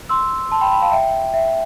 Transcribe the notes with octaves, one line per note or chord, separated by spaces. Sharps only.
C6 E6
A5 C6
G5 B5
G5 B5
F5 A5
E5 G5
E5